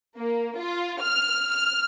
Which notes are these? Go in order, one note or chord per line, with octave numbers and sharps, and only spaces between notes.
A#3
F4
F6
F6